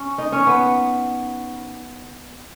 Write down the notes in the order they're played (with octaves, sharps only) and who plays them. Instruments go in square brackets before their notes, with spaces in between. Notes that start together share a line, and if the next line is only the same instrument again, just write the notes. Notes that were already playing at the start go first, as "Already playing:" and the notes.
Already playing: [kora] C#4
D#4
C#4
B3